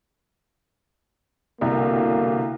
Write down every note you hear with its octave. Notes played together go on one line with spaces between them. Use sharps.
C2 B2 D3 A#3